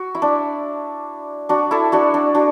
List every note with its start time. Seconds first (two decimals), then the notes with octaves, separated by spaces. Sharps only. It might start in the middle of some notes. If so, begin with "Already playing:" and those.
Already playing: F#4
0.15 E4
0.22 D4
1.49 D4 F#4
1.71 E4 A4
1.92 D4 F#4
2.14 D4
2.35 D4 F#4